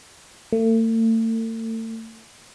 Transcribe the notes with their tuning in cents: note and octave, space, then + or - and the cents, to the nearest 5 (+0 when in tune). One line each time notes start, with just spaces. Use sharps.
A3 +40